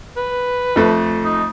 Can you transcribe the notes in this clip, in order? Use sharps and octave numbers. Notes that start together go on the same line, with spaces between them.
B4
F2 A3
D#4